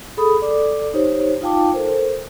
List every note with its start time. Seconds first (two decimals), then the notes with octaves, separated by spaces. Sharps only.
0.17 G#4 A4 B5 D#6
0.41 A4 D5 D6
0.94 D#4 G4 C5 C#5
1.41 D#4 F4 F5 G5 A5 D6
1.74 A4 A#4 C5